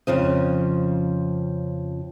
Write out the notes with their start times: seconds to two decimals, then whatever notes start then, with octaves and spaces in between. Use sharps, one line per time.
0.07 F2 C#3 F3 D#5